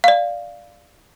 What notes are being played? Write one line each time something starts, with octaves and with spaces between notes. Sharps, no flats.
D5 F5